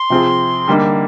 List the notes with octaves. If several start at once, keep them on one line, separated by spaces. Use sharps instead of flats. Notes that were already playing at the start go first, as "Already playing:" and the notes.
Already playing: C6
C3 F3 C4 F4 G#4
D3 G3 A#3 D#4